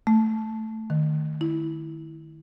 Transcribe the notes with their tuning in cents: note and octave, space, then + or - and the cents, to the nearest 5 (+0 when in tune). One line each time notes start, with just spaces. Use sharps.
A3 +5
D#3 -20
E4 -10